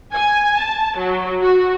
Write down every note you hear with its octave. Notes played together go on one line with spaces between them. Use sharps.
G#5
A5
F#3
F#4